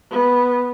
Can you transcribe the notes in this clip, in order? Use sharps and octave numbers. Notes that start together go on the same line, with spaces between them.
B3